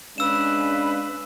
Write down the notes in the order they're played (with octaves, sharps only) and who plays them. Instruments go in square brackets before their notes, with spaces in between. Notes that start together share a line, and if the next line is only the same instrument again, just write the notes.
[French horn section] G#3 C#4 D4 [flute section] B4 F5 [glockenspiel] E6 E7